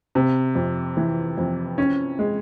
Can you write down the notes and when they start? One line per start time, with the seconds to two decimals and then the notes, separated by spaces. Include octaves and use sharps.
0.15 C3
0.55 F2
0.97 E3
1.38 F2
1.78 C#4
2.19 G#3